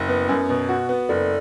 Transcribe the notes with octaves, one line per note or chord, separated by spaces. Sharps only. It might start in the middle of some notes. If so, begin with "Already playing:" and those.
Already playing: F#1
B3
F#2
B2
F#4
B3
F#1 A4 D5